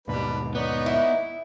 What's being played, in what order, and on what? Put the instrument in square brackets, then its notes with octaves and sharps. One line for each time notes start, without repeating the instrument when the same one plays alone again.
[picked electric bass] D#2 G#2 B2 [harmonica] G3 D4 B4
[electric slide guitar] B3 [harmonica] D#4 C#5 D5
[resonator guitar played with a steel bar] E4